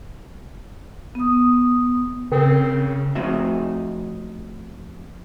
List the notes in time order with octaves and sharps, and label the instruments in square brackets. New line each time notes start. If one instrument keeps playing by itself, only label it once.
[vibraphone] B3 D#6
[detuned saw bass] C#3 [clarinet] C4 [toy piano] A4 A#4 G5
[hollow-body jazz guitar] F3 A3 C4 D#4 F#4 E5